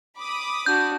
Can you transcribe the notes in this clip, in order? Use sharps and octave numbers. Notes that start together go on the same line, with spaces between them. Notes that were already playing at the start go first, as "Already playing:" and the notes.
B5 D6 D#6
D4 F#4 G6